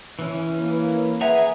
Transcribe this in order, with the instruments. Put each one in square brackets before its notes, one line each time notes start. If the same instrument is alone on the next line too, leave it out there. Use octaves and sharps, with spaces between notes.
[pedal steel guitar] E3 C#4
[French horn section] A#3 B4
[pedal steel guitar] G#4 G#5 A#5 [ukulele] E5 F#5